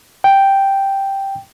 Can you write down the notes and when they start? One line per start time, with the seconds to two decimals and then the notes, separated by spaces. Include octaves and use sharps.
0.24 G5